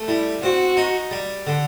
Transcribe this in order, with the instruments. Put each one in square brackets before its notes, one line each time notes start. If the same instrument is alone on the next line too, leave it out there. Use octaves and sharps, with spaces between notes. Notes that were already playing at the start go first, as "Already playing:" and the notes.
Already playing: [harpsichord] A3
[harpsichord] G3 [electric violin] E4
[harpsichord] C4 [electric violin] F#4
[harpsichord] D#4
G3
D3